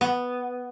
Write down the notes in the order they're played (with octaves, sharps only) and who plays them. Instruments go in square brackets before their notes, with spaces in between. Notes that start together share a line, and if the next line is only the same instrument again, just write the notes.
[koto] B3